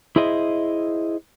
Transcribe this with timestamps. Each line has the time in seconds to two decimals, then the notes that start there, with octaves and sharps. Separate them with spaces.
0.16 E4 G#4 C5 D#5 E5